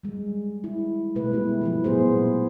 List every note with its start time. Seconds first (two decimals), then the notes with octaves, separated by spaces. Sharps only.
0.03 G3 G#3
0.64 E4
1.15 B2 G#3 A3 B4
1.32 G3 B3 E4 G4
1.61 F3 F#3 E4
1.84 A#2 B3 G#4 C5